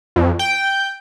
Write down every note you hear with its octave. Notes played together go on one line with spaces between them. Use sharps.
F2
G5